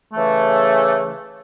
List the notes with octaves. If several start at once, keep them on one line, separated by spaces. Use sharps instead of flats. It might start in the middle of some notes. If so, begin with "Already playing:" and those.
C#3 E3 A3